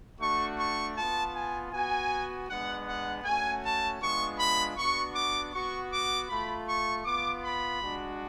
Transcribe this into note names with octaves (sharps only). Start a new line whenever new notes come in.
A3 D4 F#4 C#6
C#6
B3 F4 A5
G#5
B3 F#4 G#5
G#3 B3 D4 F#5
F#5
A3 C#4 F#4 G#5
A5
G#3 B3 D4 F4 C#6
B5
B3 D4 F#4 C#6
D6
B3 F#4 C#6
D6
A3 F4 B5
C#6
B3 F4 D6
B5
G#3 D4 F#4